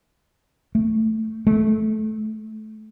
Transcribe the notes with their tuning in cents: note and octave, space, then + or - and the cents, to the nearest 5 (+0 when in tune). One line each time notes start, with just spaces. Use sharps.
A3 +5
A3 -20